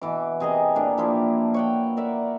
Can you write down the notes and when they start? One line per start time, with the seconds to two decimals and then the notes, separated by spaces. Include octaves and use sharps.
0.01 B2 E3 D6
0.40 C3 G#4 A#4 D#5
0.75 A#2 D4 A#4
0.97 F3 A#3 E4 G4
1.54 C#5 F#5 G5
1.97 A#4 D5 E5 F#5